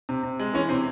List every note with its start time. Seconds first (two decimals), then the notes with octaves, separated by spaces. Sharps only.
0.09 C3
0.23 C3
0.39 G#3
0.54 E3 C#4
0.69 C3 C4